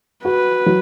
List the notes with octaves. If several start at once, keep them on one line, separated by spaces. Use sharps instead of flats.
F#4 B4
F#3